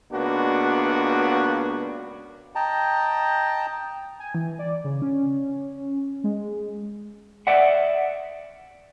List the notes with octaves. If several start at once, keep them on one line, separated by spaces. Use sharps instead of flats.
C#2 A#3 B3 D4 F#4
D#5 G5 A5 A#5
G#5
E3
D5
C#3
C#4
G#3
D5 E5 F#5